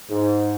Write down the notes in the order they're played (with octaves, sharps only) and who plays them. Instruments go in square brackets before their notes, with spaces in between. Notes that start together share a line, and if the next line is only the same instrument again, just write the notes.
[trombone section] G#2